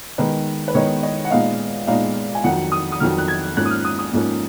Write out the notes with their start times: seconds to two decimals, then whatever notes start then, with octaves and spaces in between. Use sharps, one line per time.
0.18 D#3 G#3 B3 D#4 B4
0.68 B4
0.74 D#3 G#3 B3 D#4 C#5
1.03 D#5
1.25 F#5
1.31 A#2 G#3 B3 D#4 F5
1.87 A#2 G#3 B3 D#4 F5
2.35 G#5
2.44 F2 D#3 F#3 F#5
2.72 D#6
2.92 D#6
3.00 F2 D#3 F#3 F6
3.18 F#6
3.28 G#6
3.56 G#2 F3 A#3 C#4 F#6
3.65 D#6
3.71 F6
3.85 D#6
3.99 D#6
4.13 G#2 F3 A#3 C#4